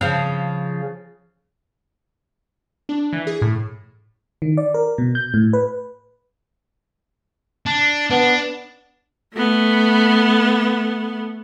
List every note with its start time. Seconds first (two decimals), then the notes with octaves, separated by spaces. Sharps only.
0.01 C#3 F3
2.89 D4
3.13 E3
3.27 G#4
3.42 A2
4.42 D#3
4.57 D5
4.74 A#4
4.98 B2
5.15 G6
5.34 A2
5.53 B4
7.66 D4
8.10 B3 D4
9.34 A3 B3